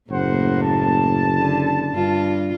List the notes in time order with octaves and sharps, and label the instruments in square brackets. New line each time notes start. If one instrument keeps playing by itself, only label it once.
[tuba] F#1 [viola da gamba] A2 A#3 [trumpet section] C5 F#5
[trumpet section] A5
[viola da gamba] D3
G2 F4